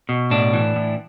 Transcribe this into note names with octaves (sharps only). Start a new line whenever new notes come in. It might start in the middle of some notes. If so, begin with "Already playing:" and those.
B2
A2 D4
E3
A2